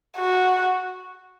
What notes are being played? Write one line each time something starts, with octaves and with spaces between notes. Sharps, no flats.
F#4